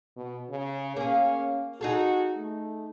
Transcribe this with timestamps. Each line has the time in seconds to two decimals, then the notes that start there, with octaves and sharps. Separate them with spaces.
0.17 B2
0.50 C#3
0.96 A#3 C#4 G#4
1.81 D#4 F#4 G#4 A4
2.37 A3